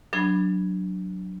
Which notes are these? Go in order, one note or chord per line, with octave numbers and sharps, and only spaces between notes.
F#3 D4 B5 G#6